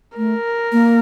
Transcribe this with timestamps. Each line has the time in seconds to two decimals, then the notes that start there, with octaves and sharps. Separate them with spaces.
0.17 A3 A#4
0.72 A#3